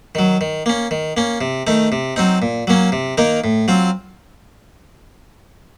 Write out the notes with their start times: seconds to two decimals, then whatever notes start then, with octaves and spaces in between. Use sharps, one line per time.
0.15 D#3 F#3
0.41 D#3
0.66 A#3 C#4
0.91 D#3
1.17 A#3 C#4
1.41 C3
1.67 D#3 A3 D#4
1.92 C3
2.16 F#3 C4 D#4
2.42 A#2
2.67 F#3 A#3 C#4
2.92 C3
3.18 D#3 A#3 D#4 A#4
3.44 A2
3.68 F#3 C4 F4